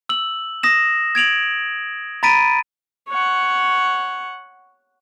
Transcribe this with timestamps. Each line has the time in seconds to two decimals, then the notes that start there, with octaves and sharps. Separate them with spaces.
0.09 E6 F#7
0.63 D#6 A#6 E7
1.15 G#6 D7 F7 F#7
2.23 A#5 B5 A6 B6 D7 D#7
3.09 C#5 F#5